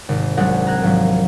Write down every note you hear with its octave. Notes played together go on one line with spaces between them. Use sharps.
G#1 C3
C2 F#3 G#3 C4 D4 F#5
A#5 F#6 G#6
G#1 F3 F#3